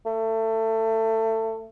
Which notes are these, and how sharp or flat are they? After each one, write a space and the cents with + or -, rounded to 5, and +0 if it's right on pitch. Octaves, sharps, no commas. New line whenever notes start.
A3 +25